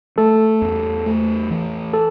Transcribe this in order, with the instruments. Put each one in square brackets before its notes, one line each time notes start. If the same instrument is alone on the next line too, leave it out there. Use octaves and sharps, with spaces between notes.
[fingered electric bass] A3 [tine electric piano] A4
[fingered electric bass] E2
A3
E3
[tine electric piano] A4